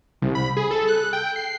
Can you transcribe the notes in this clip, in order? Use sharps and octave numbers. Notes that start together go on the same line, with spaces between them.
C2
B5
G#4
A4
F#6
G5
C7